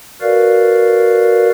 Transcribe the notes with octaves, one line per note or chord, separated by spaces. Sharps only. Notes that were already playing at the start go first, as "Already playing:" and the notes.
F#4 A#4 B4 D5 F5